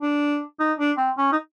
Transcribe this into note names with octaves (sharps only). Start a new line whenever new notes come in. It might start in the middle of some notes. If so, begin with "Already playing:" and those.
D4
D#4
D4
C4
C#4
D#4